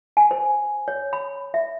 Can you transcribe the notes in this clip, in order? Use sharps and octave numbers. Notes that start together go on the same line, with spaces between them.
G#5
C5
C#5
B5
E5